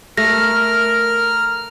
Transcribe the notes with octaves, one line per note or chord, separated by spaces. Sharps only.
A3 A#4 F6 A#6